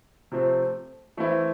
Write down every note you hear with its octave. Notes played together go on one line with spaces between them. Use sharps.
C3 F3 A3 C4
E3 A3 C4 E4